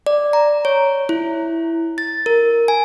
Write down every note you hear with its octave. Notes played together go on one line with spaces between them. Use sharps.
D5
A#5
C#5
E4
A6
A#4
G#5